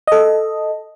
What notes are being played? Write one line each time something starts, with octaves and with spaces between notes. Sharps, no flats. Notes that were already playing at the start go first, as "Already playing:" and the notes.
A4 D#5